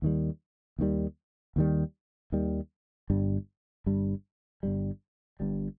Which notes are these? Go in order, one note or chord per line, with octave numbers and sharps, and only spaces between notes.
D#2 D#3 G3
D#2 D#3 G3
D#2 D#3 G3
D#2 D#3 G3
G1 G2 G3
G1 G2 G3
G1 G2 G3
G1 G2 G3